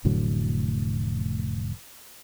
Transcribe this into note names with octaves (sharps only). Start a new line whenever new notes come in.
F1 A2 D3 F#3